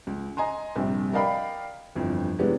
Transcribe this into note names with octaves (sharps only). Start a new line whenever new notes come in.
C#2
D#5 G#5 A#5 C6
A#1 G2 C3 C4 G4
A#4 D5 D#5 F5 G5 B5
G1 F2 E3
C3 E3 G#3 B3 C#4 D4